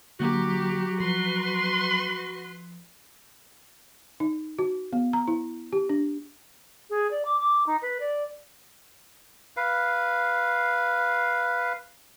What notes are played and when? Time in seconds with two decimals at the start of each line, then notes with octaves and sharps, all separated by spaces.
0.20 D3 F#3 A#3 F#4 G4 A#5
1.00 F3 B4 C6
4.20 D#4
4.58 F#4
4.93 B3
5.13 A#5
5.28 E4
5.73 G4
5.89 D4
6.90 G#4
7.10 D5
7.25 D6
7.39 D6
7.66 D#4
7.82 B4
8.00 D5
9.57 B4 F5